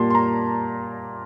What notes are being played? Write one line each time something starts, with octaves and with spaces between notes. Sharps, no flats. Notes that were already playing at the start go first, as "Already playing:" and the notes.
Already playing: A#2 G3 A#3 A5 C6
C6
A#5